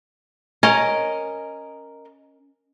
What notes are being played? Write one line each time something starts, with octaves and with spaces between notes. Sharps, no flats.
C#4 A#4 D#5 D#6